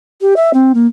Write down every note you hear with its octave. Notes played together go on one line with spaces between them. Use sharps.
G4
E5
C4
A#3